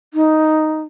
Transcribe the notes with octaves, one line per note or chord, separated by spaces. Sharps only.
D#4